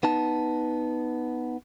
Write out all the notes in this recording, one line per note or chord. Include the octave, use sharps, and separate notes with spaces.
B3 D#4 A5